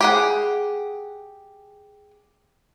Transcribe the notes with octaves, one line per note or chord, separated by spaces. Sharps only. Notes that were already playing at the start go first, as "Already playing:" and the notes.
G4 G#4 F#5